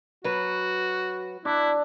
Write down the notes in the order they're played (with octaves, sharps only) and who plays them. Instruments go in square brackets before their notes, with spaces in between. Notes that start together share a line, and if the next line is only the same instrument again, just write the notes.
[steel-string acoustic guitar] F#3 B4 [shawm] F#4
[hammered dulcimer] D4 D6 [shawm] E4